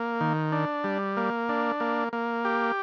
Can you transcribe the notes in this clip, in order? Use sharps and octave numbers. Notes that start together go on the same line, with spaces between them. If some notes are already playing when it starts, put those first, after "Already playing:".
Already playing: A#3
D#3
D4
G3
A#3
D4
A#3
A#3
G4